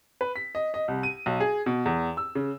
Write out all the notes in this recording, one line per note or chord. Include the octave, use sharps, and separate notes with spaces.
B4
B6
D#5
D#5
C2
D#7
B1
G#4
B2
E2
E6
C#3